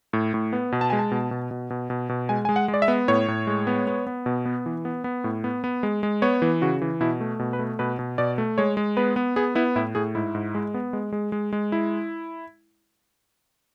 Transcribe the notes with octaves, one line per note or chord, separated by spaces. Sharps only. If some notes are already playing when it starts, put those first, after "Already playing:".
A2
A2
B3
B2
A5
G#3 G#5
A5
B2
B2
B2
B2
B2
B2
G#3 G#5
G#3 G#5
F#5
G#3
D5
E5
B3
A2 C#5
A2
G#3
B3
B3
B3
B2
B3
E3
B3
B3
A2
B3
B3
G#3
G#3
B3 C#5
E3
C#3 F#4
E3
B2 E4
A3
B2
B4
A3
B2 B4
B2
B2 D5
A3
G#3 C#5
G#3
B3 B4
B3
B3 G#4
B3 E4
A2 E4
A2 G#4
G#2 E4
G#2
G#3
B3
G#3
G#3
G#3
G#3
E4